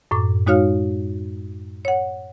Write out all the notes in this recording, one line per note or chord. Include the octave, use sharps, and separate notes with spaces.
F#2 A2 D6
G#3 D#4 F#4 C#5 F5 F6
C#5 F#5